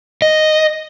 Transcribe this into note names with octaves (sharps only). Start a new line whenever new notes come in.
D#5